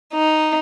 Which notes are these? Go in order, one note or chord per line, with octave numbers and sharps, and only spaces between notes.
D#4